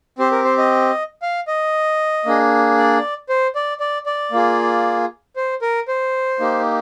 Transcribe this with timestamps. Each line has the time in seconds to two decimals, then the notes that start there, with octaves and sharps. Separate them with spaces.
0.19 C4 G4 C5
0.32 A#4
0.44 C5
0.58 D#5
1.22 F5
1.48 D#5
2.26 A#3 D4 G#4
2.78 D5
3.29 C5
3.55 D5
3.80 D5
4.06 D5
4.32 A#3 F4 G#4
5.36 C5
5.62 A#4
5.88 C5
6.40 A#3 D#4 G4